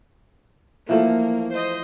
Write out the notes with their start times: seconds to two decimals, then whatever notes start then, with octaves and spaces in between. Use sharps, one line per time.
0.89 E3 F3 A3 A#3
1.52 C5 D#5